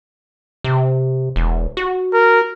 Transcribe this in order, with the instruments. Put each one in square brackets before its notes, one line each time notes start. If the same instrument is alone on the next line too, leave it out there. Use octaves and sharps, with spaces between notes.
[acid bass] C3
E1
F#4
[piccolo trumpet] A#4